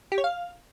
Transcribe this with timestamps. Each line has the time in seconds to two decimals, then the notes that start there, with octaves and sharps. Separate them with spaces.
0.12 G4
0.18 C#5
0.24 F5